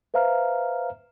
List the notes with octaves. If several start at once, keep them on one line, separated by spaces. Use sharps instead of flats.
B4 C5 E5 F5 A#5 F6